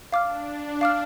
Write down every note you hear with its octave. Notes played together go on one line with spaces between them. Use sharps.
D4 F5 D6 F6
F5 D6 F6